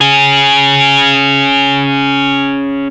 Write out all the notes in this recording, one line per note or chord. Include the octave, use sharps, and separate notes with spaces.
C#4 G#4